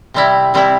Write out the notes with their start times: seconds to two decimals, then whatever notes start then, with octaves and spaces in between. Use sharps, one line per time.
0.14 C3 G3 C4 E4
0.54 C3 G3 C4 E4